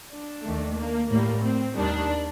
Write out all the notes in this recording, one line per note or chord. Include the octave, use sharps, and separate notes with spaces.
D4
D#2 D#3 A3
A#3
A2 G3 A#3
C4
D#2 D#3 G3 D4